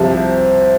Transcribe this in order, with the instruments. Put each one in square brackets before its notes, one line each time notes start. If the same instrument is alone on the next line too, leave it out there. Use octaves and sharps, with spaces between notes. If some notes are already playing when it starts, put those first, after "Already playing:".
Already playing: [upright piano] C2 C3 F3 A5